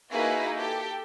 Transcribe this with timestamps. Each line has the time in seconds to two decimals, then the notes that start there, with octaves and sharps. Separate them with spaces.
0.12 A#3 D#4 E4 F#4 G#4 B4
0.56 G4 A4